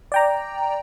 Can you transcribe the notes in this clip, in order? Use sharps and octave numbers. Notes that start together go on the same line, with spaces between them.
D5 G5 A#5